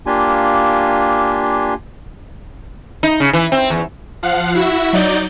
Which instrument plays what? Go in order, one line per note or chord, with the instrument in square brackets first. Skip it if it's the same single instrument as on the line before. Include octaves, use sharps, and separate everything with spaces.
[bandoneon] A#3 D4 F4 G4 G#5
[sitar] D#4
C#3
E3
C4
E2
[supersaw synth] F3 F5 F#5 F#6 C7
E4 F#4 E5
F#3 D#4 D5 G6